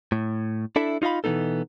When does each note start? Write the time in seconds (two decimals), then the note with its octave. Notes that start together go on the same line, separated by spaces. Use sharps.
0.12 A2
0.76 D4 E4 A4 E5
1.02 D#4 F4 D#5 F5 B5
1.24 B2 E3 A#3 B3 D#4 A4